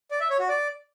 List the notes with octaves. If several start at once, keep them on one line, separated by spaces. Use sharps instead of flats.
D5
E5
C#5
F#4
D5